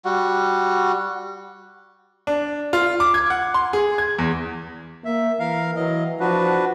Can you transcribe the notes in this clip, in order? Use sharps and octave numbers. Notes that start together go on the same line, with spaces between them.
G3 F#4
D4
F4
D6
G#6
F#5
C6
G#4
G#6
E2
A#3 E5
E3 A#4 F5
E3 F#3 D#5
F3 D4 F#4 B4